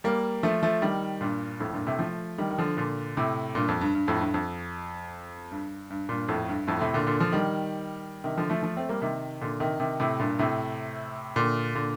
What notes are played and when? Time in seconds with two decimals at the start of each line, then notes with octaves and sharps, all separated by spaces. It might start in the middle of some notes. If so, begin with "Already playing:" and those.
0.04 G3 A#3
0.43 F3 A3
0.63 F3 A3
0.82 D#3 G3
1.21 G2 A#2
1.60 F2 A2
1.73 G2 A#2
1.86 A2 C3
1.99 F3 A3
2.38 D#3 G3
2.51 D#3
2.58 D3 F3
2.77 A#2 D3
3.17 A2 C3
3.55 G2 A#2
3.68 F2
3.81 G2
3.95 G2
4.08 F2 A2
4.21 G2
4.34 F2
5.51 G2
5.90 G2
6.09 G2 A#2
6.28 F2 A2
6.49 G2
6.67 F2 A2
6.81 A2 C3
6.94 A#2 D3
7.07 A#2 D3
7.20 D3 F3
7.32 D#3 G3
8.24 C3 D#3
8.38 D3 F3
8.50 F3 A3
8.63 F3 A3
8.77 A3 C4
8.89 G3 A#3
9.02 C3 D#3
9.41 A#2 D3
9.60 C3 D#3
9.80 C3 D#3
10.00 A2 C3
10.20 G2 A#2
10.39 A2 C3
11.36 A#2 D3
11.75 A#2 D3